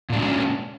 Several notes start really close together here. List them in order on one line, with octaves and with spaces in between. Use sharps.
A#2 D4 G#3 F#3 C#4